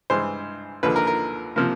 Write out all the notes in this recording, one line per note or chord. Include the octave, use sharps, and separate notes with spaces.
G2 E3 G#3 C5
D#2 D3 F3 B4
A#4
A#4
C3 F3 A#3